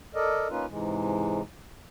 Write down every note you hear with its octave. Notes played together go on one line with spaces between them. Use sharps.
A4 A#4 D5 D#5
A#3 C#4 D#4 F4 B4
G#2 C3 E3 G#3